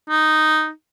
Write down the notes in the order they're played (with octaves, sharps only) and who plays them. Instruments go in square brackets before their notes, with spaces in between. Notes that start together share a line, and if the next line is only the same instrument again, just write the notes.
[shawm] D#4